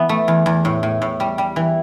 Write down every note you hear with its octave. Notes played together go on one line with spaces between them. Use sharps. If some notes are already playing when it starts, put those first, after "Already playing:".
Already playing: E3 B3
A3
E2
E2
A2
A2
A2
G3
G3
E3